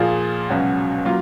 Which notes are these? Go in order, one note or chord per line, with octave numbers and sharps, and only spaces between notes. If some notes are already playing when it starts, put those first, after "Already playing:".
Already playing: A#2 F3 A#3 F4 G#4
C#2 B2 F#3 C#4 F#4
F#3 A#3 F4